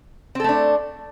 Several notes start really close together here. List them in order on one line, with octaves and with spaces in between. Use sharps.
C4 A4 A3 D4